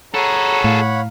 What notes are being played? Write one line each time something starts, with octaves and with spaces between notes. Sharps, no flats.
G#4 A4 C#5 F#5 A#5 B5
A2 F5